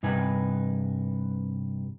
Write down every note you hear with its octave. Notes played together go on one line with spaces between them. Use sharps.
G2 C3 D#4 B4 G#5